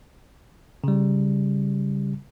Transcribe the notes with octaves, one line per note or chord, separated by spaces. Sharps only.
C#3 G3